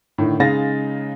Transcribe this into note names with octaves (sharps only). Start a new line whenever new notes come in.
A2 D3 D#3
C#3 G#3 D#4 F5 A6 A#6